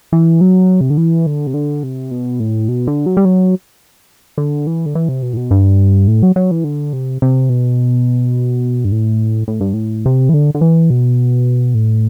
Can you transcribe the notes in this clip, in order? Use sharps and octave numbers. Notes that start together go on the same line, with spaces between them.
E3
F#3
C3
D3
E3
D3
C3
D3
C3
B2
A2
B2
D3
F#3
G3
F#3
D3
E3
D3
E3
C3
B2
A2
B2
G2
A2
F#3
F#3
E3
D3
C3
C3
B2
G2
A2
A2
G2
A2
C3
E3
D3
D3
E3
B2
A2